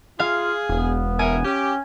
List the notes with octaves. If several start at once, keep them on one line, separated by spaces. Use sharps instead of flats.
F4 G#4 F5
E1 B3
C#4 A#4 E5 G#5
C#4 G4